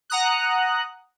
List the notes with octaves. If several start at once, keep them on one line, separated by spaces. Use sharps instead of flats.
F#5 A#5 D#6 F#6